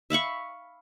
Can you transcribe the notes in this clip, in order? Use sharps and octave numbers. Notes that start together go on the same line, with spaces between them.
E5 F5 B5 C#6